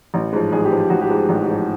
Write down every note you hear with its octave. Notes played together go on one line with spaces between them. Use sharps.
A1
G#2 F3
A1 G#4
G4
G#2 F3
G4
A1 F#4
G4
G#2 F3
A1
G#2 F3